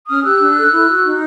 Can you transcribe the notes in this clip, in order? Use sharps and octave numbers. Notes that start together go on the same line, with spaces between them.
C#4 D#6 F6
G4 E6 F#6
D4
A4
E4
F#4
D#4